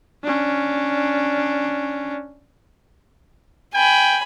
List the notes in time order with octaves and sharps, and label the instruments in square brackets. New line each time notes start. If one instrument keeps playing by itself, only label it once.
[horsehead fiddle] C#4 D4
[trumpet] G5 [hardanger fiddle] G#5 B5